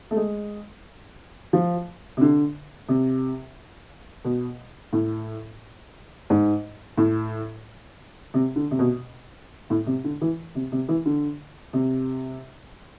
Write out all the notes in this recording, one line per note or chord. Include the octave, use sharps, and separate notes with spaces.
A3
G#3
F3
C3
D3
C3
B2
A2
G#2
A2
C3
D3
C3
B2
A2
C3
D3
E3
C3
C3
E3
D3
C3